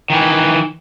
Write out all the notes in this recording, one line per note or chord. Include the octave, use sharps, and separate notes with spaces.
D#3 E3